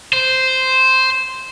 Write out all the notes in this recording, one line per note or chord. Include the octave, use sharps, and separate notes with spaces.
C5